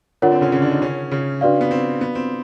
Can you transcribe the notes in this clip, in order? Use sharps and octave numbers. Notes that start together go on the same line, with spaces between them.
D3 D4 F4 A#4 C#5 F#5
C4
C#3 C#4
C#3 C#4
D3 D4
D#3 D#4
C#3 C#4
C#3 C#4
D4 F#4 B4 D5 F5
B3
C4
B3
C4